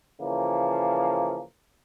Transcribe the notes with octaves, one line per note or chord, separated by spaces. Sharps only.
C#3 E3 F3 A#3